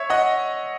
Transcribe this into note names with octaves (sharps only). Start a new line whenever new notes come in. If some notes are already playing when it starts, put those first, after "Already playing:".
Already playing: C#5 E5
D#5 F#5